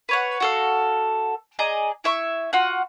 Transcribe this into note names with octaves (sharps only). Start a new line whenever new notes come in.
B4 C#5 F#5
F#4 A4 F5
G#4 D5 D#5 A#5
E4 E5 C#6
F4 F#4 F#5